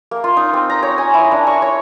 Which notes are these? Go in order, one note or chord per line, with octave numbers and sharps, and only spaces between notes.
A#3
F4
D#4
C4
A#5
C#5
G#5
E4
D4
C#6
C#5